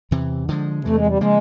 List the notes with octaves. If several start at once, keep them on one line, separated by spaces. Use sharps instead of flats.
E2 C3 E3
D3 F3 G#3
E2 C3 E3 A3
G#3
G3
C#3 F3 G#3 A#3